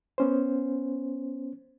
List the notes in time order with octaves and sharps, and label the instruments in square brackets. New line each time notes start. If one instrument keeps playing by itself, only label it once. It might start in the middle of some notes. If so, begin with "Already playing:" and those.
[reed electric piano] B3 C#4 C5